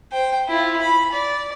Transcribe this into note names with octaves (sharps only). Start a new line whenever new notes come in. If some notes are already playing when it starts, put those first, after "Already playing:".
C5 G5
E4 F4
B5
D5